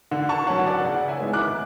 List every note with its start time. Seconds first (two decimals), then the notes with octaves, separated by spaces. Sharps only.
0.11 D3
0.29 A5 C#6
0.47 F#3 C#4 F#5 A5
0.66 D5 F#5
0.84 C#3 D5 F#5
1.08 E5 G#5
1.20 G#3 B3 E4
1.33 D6 F#6